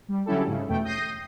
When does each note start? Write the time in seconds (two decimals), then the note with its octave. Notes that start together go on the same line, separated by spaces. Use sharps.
0.08 G3
0.26 D3 F#3 C#4 E4 G4 A4
0.47 G#2 C#3
0.69 E2 B2 A3 G5
0.84 D#6 G6 A#6 C7 D#7